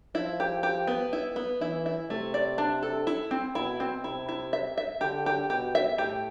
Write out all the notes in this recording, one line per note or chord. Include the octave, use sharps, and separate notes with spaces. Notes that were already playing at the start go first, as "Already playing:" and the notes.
F3 E4
G4
G4
B3
E4
B3
E3 E4
E4
C3 A3
D5
D4
A4
E4
C4
B2 E4
C4
C3 E4
E4
E5
E5
D3 G4
G4
B2 G4
E5
A2 G4